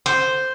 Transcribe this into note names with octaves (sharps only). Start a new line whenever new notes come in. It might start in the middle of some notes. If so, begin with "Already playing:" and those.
C5